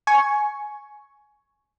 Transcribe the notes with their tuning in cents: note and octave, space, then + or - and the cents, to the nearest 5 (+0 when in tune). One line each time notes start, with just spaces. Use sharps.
G#5 +10 C#6 +0